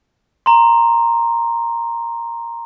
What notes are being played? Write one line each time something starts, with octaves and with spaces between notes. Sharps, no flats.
A#5 C6